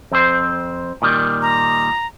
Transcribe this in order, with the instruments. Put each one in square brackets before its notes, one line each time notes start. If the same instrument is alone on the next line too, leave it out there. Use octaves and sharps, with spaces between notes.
[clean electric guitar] F2 C4 C5
A#2 D#3 G3
[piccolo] A#5